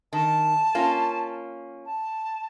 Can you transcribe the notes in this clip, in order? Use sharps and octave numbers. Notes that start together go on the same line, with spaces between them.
D#3 A5
A#3 C#4 F4
A5